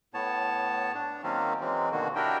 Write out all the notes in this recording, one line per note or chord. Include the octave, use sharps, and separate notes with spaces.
A2 B3 C#5 A5
D4
D#3 F#3 A#3 C4 C#4
E3 F#3 G#3 C4
B2 D3 D#3 A#3 F#4
D4 E4 F#4 G4 A#4 G5